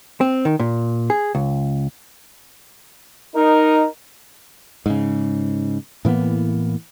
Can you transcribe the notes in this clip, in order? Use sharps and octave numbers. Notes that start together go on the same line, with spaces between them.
C4
D#3
A#2
G#4
C#2
D#4 A#4
G#2 C#3
A2 E3 A#3 B3